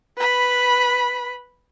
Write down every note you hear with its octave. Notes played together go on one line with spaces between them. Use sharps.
B4 B5